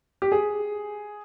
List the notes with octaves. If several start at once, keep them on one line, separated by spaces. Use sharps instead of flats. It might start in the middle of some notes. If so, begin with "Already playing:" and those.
G4
G#4